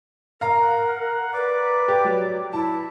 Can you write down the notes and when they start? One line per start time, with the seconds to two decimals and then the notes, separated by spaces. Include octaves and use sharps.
0.41 A#4 F5 A#5
0.62 F#5
1.33 B4 D5
1.88 G4
2.04 F#3
2.53 E4 A5